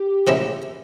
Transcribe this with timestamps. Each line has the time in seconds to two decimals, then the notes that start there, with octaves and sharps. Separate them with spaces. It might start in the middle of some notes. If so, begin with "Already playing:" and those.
Already playing: G4
0.27 C#3 F3 A#3 C#4 E4